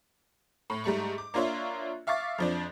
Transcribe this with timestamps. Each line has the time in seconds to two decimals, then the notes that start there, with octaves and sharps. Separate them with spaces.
0.70 A2
0.84 G#2 G3 A3 C#6
1.18 D6
1.34 A#3 D4 F4 C#5 E5
2.07 E5 F5 C#6 D6 A6
2.38 F2 F3 D4